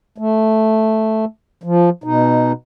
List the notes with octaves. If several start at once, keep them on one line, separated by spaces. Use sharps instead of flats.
A3
F3
B2 D#4